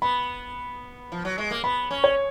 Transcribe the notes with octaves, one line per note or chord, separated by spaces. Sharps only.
B3 B5
F3
F#3
G#3
A#3
B3 B5
C#4
C#5